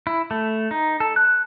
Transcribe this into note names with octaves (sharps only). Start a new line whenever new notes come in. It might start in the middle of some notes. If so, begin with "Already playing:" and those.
E4
A3
D#4
A4
F#6